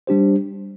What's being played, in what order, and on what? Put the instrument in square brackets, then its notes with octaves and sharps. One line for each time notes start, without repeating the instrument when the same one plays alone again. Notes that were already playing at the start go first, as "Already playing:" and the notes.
[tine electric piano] G3 D4 G4 C5